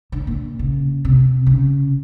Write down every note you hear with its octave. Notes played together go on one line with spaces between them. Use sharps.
D3
A#2
C#3
C3
C#3